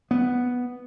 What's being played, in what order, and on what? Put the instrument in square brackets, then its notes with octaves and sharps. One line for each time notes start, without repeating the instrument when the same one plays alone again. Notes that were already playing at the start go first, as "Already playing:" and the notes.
[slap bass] B3